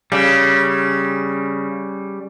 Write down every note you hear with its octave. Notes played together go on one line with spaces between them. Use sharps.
C#3 G3